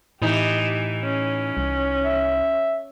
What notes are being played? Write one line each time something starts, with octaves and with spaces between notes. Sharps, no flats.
A2 E3 D#4 G4
C#4
C2
E5